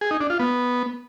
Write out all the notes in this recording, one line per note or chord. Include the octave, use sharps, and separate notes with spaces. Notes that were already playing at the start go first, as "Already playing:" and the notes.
G#4
D#4
D4
F4
B3